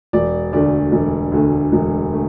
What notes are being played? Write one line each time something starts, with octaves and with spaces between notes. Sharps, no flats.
E1 D5
D2 D3 A3 D5
E1
D2 D3 A3
E1
D3 A3